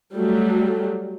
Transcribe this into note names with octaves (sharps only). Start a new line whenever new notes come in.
F#3 G3 A3